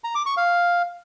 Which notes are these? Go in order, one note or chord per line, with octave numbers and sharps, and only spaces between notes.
A#5
D6
C#6
F5